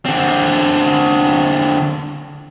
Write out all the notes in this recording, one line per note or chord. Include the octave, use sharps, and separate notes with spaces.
D3 C4